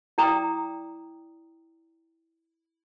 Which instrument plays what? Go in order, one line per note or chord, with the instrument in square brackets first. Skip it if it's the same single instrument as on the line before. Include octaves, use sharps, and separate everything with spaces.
[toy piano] E4 D5 G5 A#5 D6 D#6